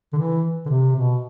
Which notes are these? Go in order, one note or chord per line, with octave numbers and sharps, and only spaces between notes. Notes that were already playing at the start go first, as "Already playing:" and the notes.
D3
E3
D3
C3
B2